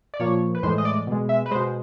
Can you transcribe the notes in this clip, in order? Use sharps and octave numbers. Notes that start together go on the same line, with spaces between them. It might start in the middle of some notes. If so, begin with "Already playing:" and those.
D5
A#2 F3 A#3 C#5
B4
A2 E3 G#3 C5
D#5
D5
B2 G#3
E5
B4
B2 G#3 C5